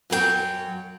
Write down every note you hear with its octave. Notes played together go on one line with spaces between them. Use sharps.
F#2 F#3 A#4 G5